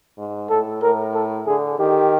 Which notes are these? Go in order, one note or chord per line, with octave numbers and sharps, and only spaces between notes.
G#2
A2 A4
A2 A#4
A4
D3 G#4
D#3 G4